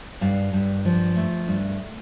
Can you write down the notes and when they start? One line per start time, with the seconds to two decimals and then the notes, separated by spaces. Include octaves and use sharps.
0.21 G2 D5 F5
0.53 G2
0.85 F3
1.16 A3
1.48 G2